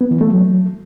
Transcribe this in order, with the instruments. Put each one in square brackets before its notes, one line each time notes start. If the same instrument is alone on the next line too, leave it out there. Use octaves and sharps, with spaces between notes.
[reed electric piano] B3
E3
A3
F#3